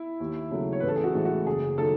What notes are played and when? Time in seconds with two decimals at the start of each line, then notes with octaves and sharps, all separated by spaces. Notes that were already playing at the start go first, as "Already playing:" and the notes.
Already playing: E4
0.20 D#2
0.51 C#3 F#3 A3
0.73 C#5
0.80 A1 B4
0.88 A4
0.96 G#4
1.04 F#4
1.15 A2 E3 G#3
1.25 F#4
1.46 F#1 G#4
1.78 D#3 F#3 A3 A4